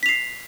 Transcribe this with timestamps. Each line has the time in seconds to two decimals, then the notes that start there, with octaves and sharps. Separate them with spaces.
0.03 B6
0.06 F7
0.09 C7